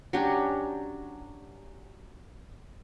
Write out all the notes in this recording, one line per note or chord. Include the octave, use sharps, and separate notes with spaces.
F#3 C#4 D4 G4